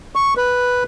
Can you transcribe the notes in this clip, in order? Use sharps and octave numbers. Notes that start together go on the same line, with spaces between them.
C#6
B4